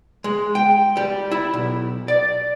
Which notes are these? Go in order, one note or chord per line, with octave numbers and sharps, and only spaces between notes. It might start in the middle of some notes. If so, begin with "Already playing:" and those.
G#3
G5
G3
E4
B1
D5